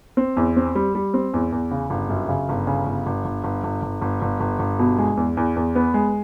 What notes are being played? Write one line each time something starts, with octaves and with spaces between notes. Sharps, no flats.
C4
E2
C4
G3
G3
C4
E2
E2
C#3
G1
F#2
C#3
G1
C#3
G1
G1
G1
G1
G1
G1
G1
G1
G1
G1
B2
G#3
E2
E2
E2
B3
G#3